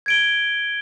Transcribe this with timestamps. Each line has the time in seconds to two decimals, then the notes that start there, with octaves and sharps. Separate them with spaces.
0.06 G#6 D7 G7